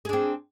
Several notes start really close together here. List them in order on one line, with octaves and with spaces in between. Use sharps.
G#4 D4 C4